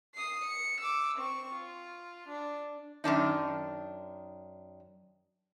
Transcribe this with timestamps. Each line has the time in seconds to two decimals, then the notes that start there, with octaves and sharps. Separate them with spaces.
0.15 D#6 C7
0.44 C#7
0.81 D6 E6
1.18 C4 C#6
1.53 F4
2.28 D4
3.04 F#2 D#3 D4 D#4